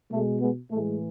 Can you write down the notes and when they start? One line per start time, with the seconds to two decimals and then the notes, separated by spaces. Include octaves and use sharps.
0.12 B2 G#3 A3
0.41 G#3 B3
0.71 A2 E3 G#3 A3